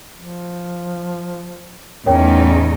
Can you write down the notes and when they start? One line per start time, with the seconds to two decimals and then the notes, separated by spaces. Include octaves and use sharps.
0.16 F3
2.06 E2 A2 C#4 D#4 A#4 C#5 G5